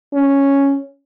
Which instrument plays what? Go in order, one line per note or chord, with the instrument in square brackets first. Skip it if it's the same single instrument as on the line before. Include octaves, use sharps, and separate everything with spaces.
[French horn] C#4